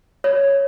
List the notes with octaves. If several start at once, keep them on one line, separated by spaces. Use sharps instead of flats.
C#5